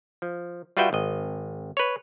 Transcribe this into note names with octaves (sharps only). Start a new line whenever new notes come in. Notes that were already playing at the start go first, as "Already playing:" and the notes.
F3
G3 F4 F#4 B4 E5 G5
G#1 D#5
B4 C#5